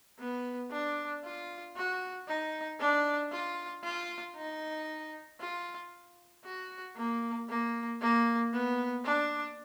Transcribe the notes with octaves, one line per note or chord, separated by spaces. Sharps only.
B3
D4
F4
F#4
D#4
D4
F4
F4
D#4
F4
F#4
A#3
A#3
A#3
B3
D4